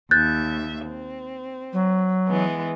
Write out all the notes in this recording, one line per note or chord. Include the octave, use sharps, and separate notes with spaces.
D#2 E5 F#6 G6 A6
C4
F#3
E3 G#3 B3